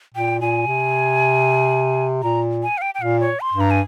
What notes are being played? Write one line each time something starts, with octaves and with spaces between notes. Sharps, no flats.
A#2 G5
A#2 G#5
C3
A#2 A#5
G#5
F5
G5
G5
A#2 F5
C#5
C6
G2
A#5
G#5